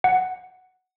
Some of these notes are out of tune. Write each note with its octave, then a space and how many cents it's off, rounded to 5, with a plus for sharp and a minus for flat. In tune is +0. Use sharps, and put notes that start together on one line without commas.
F#5 +0